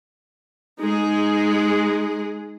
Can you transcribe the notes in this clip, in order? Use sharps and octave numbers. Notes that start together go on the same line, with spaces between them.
G#3 D#4 G#4